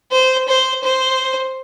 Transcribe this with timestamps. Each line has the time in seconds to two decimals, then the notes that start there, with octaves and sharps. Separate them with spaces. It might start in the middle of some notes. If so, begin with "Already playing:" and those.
0.12 C5
0.48 C5
0.84 C5